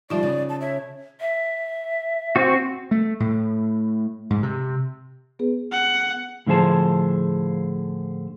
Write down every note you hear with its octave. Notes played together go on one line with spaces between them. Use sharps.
D#3 F3 G3 D#4 F4 D5 E5
C#3
A5
C#5 E5
E5
C4 F#4
A3
A2
G#2
C3
B3 G#4 B4
F#5
A2 D3 F3 G#4 C5 A5